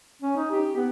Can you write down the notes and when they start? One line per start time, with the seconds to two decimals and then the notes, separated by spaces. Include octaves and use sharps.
0.22 C#4
0.37 D#4
0.51 G4
0.77 B3